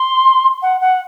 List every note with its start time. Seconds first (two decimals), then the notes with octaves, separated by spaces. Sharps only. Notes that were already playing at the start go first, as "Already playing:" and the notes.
Already playing: C6
0.62 F#5
0.80 F#5